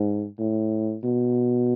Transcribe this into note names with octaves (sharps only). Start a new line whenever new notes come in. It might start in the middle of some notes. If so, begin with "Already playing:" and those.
Already playing: G#2
A2
B2